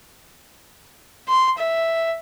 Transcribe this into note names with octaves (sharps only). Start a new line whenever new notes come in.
C6
E5